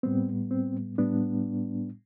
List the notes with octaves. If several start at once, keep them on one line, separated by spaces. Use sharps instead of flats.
A2 G3 B3 C4
C4
A2 G3 B3 D4